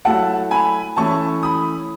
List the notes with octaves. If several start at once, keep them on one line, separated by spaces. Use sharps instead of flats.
F#3 A3 E4 F#5 A5
G#5 B5
E3 A3 C#4 E4 A5 C#6
B5 D#6